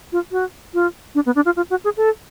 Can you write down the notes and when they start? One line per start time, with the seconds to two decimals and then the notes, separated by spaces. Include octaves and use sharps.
0.12 F4
0.32 F#4
0.74 F4
1.15 D4
1.26 B3
1.35 D4
1.45 F4
1.56 F4
1.70 F#4
1.84 G#4
1.97 A4